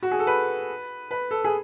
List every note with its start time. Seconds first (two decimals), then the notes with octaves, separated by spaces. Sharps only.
0.03 F#4
0.11 G#4
0.19 A4
0.27 B4
1.11 B4
1.31 A4
1.44 G#4